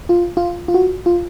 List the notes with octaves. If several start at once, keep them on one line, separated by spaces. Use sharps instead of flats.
F4
F4
F4
F#4
F4